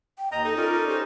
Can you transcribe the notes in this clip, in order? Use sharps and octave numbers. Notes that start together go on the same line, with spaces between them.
G5
D#2 D#5 A#5 D#6 G6
D#4 A4
C#4 F4 A#4 D5
A4
C#4 G4 C5